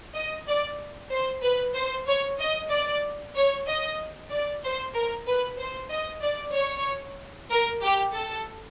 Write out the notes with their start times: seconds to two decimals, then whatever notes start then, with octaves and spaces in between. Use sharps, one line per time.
0.16 D#5
0.48 D5
1.11 C5
1.43 B4
1.75 C5
2.07 C#5
2.39 D#5
2.71 D5
3.36 C#5
3.68 D#5
4.31 D5
4.63 C5
4.95 A#4
5.27 B4
5.58 C5
5.90 D#5
6.22 D5
6.55 C#5
7.50 A#4
7.83 G4
8.14 A4